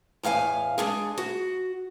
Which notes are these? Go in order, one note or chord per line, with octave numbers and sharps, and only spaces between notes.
E2 A2 F5 G5 G#5
G#3 D4 G#4
F#4